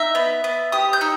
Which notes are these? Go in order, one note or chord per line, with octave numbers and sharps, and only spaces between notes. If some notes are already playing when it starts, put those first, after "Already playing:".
Already playing: D#4 E5
B3
B3
G4 D#6
G6
D#4 E6